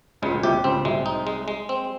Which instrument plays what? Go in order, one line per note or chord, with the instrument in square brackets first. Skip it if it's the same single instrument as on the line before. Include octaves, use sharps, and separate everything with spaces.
[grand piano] C#2 C#3 [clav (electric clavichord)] G#3
[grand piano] A#2
[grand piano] C2 C3 [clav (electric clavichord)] G4
[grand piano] C#2 C#3 [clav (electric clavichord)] C4
[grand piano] C2 C3 [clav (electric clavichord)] G#3
[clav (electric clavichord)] D#4
G#3
G#3
C4